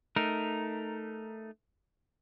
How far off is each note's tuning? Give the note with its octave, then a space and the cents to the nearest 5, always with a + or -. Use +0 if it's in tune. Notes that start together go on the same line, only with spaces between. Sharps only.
A3 +0 D#4 +0 A#4 +0